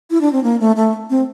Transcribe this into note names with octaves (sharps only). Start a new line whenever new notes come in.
E4
D4
C4
A#3
A3
A3
C4